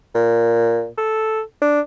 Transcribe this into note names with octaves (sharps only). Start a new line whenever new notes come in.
A#2
A4
D4